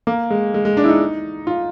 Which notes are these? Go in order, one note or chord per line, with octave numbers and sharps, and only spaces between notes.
A#3
G#3
G#3
G#3
D4
E4
D#4
F4